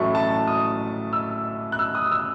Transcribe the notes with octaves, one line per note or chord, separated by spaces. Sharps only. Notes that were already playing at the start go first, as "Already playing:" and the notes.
Already playing: A1 A2 F#3 A3 C#6
A5
D#6
E6
F#6
E6
D#6
E6